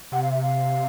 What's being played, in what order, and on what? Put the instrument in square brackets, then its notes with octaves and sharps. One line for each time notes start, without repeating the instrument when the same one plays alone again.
[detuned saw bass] C3 [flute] F#5
[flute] F5
E5
F5